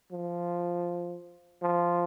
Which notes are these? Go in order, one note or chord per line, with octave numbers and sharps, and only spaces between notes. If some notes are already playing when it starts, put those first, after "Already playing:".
F3
F3